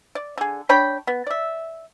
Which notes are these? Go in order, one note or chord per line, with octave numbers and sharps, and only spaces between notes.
D5
D3 G#4
D4 C#5 G5 B5
B3
D5 E5